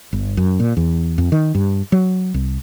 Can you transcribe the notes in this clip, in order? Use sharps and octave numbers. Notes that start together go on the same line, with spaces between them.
G1
F#2
A#2
E2
F2
D#3
G2
F#3
C2